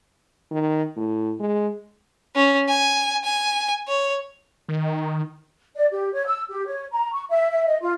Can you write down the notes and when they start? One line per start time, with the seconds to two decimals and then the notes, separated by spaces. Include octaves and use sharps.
0.51 D#3
0.96 A2
1.40 G#3
2.35 C#4
2.68 G#5
3.24 G#5
3.88 C#5
4.69 D#3
5.76 D5
5.91 G4
6.13 C#5
6.26 E6
6.49 G4
6.67 C#5
6.91 A#5
7.13 C#6
7.29 E5
7.50 E5
7.66 D#5
7.81 F4